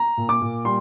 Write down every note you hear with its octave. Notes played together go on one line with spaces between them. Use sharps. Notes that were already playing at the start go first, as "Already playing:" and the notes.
Already playing: A#5
A#2
D6
A#2
G3 C6